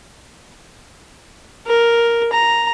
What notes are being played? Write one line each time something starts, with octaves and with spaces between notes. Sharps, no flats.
A#4
A#5